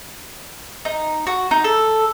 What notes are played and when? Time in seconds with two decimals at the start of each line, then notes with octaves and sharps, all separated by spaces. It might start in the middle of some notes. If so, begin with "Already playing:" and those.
0.85 D#4
1.27 F#4
1.51 D#4
1.64 A4